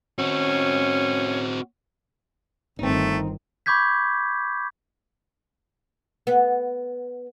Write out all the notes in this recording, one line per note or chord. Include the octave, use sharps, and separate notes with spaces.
C4 C#4 F#4
G1 D#3 A3 C4 D#4
B5 C#6 D6 G6 G#6 B6
B3